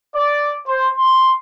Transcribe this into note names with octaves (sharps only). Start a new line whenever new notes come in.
D5
C5
C6